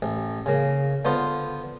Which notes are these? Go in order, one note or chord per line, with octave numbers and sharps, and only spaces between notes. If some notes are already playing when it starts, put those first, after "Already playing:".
A1
C#3 A#3
D3 B3 F4 C5